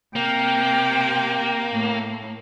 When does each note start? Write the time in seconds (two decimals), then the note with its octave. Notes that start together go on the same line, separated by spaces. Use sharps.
0.16 C3 A#3 G5
1.72 A2